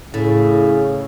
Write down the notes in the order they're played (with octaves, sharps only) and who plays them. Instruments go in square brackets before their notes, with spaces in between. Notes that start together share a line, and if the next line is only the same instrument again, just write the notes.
[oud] A2 [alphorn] C#3